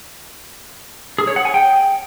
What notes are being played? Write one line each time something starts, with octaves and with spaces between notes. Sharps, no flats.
G#4
C#5
F#5
G#5
G5